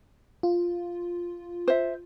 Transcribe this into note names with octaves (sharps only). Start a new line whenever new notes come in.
F4
C5 E5